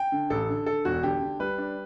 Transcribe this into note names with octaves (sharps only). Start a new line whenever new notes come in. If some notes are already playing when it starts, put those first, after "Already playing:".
Already playing: G5
D3
A1 A4
D3
D3 A4
E1 F#4
D3 G4
D3
G3 B4
D4